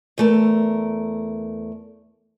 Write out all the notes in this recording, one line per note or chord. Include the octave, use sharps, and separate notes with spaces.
E2 A3 A#4